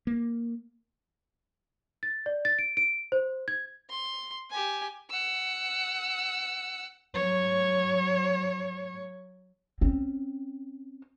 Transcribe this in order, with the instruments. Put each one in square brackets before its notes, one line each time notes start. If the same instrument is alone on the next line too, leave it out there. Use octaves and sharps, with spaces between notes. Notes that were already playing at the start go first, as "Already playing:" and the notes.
[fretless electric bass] A#3
[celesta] A6
D5
A6
D7
D7
C5
G#6
[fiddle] C6
G4 G#5
[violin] F#5 E6
[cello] F#3 C#5
[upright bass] C4 C#4